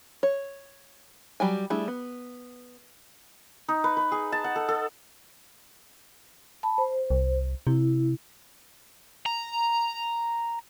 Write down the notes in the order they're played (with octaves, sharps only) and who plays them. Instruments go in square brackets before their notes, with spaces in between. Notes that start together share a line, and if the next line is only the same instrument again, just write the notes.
[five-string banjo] C#5
F#3 G3 G5 G#5
G3 A3 D4 E4 G#4
B3
[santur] D#4
B4
B4
G#4
A5
F#5
A4
A4
[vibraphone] A5 B5
C5
[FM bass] C2
[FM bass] C3 [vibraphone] E4
[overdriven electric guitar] A#5